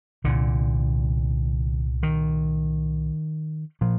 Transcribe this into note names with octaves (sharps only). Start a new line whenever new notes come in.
C2 A#2 D3
D#3
A#2 F3